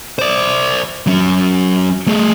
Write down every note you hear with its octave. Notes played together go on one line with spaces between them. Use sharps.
C5 D5
F#3 C#4
A3 G#4